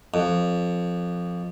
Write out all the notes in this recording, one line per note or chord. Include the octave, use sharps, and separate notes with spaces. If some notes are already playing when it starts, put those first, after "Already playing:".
F2